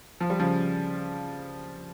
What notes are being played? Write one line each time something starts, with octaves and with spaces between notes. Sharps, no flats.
F3
G3
C#3 F3